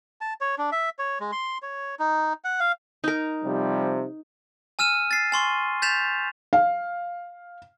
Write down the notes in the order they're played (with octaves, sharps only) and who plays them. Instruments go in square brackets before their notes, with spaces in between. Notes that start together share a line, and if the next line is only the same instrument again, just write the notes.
[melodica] A5
C#5
D4
E5
C#5
G#3
C6
C#5
D#4
F#5
F5
[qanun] D#4 A#4
[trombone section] C3 F3 G3
[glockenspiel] G#5 E6 F6 D#7 E7
A6 C7
G#5 C6 C#6
G6 A6 B6 E7 F7
[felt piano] F5